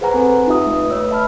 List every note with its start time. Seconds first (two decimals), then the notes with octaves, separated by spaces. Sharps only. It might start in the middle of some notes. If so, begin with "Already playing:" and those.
0.01 G#4 B4 C5 F#5 G#5 A#5
0.14 C4 A4 B4 F#5
0.47 D#4 F4 G4 E5 D#6
0.67 A3 B4
0.91 A3 B4 C#5 E6
1.11 E5 A5 B5 F6